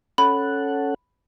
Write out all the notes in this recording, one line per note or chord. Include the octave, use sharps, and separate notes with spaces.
C#4 A4 F#5 B5